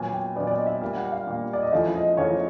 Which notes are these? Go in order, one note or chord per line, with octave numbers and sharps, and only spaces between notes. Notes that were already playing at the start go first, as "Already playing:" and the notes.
Already playing: A#2 F#3 B3 G#5
G5
A#2 F#3 B3 D5
D5
D#5
E5
A#2 G3 A#3
F#5
F5
A#2 G3 A#3
D5
D#5
E2 C#3 F3 A3 E5
D#5
E2 C#3 F3 A3 C#5